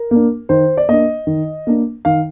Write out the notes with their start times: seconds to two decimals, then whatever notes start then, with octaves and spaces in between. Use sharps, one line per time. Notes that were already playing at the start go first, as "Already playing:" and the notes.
Already playing: A#4
0.11 A#3 D4
0.49 D#3 C5
0.77 D5
0.89 A#3 D4 D#5
1.27 D#3
1.67 A#3 D4
2.05 D#3 F5